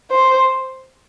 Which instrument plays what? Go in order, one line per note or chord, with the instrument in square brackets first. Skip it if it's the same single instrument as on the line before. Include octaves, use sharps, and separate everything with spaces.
[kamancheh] C5